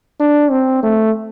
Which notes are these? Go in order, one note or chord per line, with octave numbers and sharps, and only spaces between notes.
D4
C4
A3